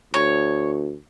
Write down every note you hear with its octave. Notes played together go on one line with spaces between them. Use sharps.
D2 C#5